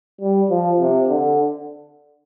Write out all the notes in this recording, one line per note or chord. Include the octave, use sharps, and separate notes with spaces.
G3
F3
C3
D3